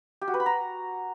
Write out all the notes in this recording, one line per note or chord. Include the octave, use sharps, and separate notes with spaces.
G4
F#4
B4
B5
A#5